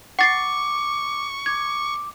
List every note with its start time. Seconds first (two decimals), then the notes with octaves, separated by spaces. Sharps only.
0.19 F#5 C#6 D6 A6 C7
1.46 D6 G#6